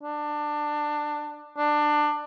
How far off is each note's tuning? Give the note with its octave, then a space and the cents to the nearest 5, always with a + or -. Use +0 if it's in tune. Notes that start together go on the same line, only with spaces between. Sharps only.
D4 +20
D4 +20